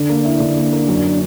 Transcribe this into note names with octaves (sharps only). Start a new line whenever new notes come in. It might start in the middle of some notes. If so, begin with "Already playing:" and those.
Already playing: D3 D4
A#3
E4
D3
A#3
A#3
F#2